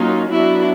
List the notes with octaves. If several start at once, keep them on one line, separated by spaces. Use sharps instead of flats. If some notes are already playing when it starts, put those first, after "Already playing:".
Already playing: F#3 A#3 C#4 D#4 F4
F#3 B3 D4 E4 F#4